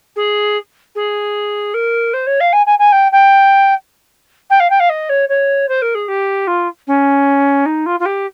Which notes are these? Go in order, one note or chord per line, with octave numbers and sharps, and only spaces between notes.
G#4
G#4
A#4
C5
C#5
F5
G#5
G#5
G#5
G5
G5
G5
F5
G5
F5
D#5
C#5
C#5
C5
A#4
G#4
G4
F4
C#4
D#4
F4
F4
G4